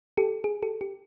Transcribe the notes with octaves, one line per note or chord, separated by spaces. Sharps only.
G4 A4
G#4
G4 A4
G4